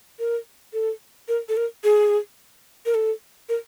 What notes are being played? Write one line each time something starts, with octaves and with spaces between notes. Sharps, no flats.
A#4
A4
A#4
A4
A#4
G#4
A#4
A4
A#4